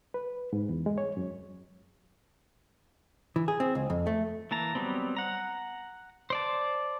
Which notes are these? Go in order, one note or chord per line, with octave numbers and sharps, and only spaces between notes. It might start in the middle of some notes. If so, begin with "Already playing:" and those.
B4
G#2
E2
G#3
C#5
F#2
E3
G#4
C4
C#2
F2
A3
E3 A#3 A5 A#5
F#3 G3 B3 C4
F#5 A#5
C5 D5 A5